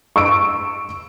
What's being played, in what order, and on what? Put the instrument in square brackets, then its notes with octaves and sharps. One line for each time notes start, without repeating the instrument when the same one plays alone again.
[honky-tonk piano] C#6 E6 D7